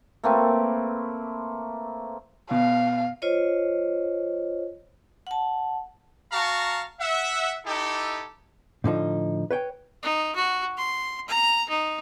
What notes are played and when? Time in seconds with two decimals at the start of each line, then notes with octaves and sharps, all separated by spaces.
0.24 A3 A#3 C4 B4
2.51 B2 F5
3.22 F4 C5 C#5 D#5
5.27 F#5 A5
6.32 F#4 F5 A5 A#5 C#6
7.00 E5 F#5
7.65 D#4 E4 G4 A4
8.84 A2 D3 F3 D#4
9.51 B4 C#5 G5
10.03 D#4
10.35 F#4
10.77 C6
11.28 A#5
11.69 D#4